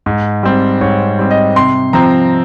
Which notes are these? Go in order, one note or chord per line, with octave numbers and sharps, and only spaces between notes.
G#2
G3 C4
G#2 C#5
G3 C4
D#5
C3 C6
F3 C4 A#5